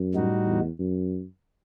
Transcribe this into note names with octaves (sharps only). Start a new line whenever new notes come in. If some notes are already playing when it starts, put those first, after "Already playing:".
Already playing: F#2
A2 G3 D#4 F#4
E2
F#2